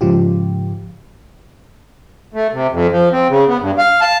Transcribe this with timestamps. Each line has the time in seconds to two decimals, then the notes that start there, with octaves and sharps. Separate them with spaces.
0.01 G#2 C#3 F3 F4 G4
2.34 A3
2.52 C3
2.72 F2
2.91 F3
3.12 C4
3.30 C#3
3.48 B3
3.60 G2
3.78 F5
4.01 A5